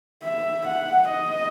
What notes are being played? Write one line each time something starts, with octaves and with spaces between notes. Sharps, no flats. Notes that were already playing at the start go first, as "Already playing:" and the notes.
E5
F#5
D#5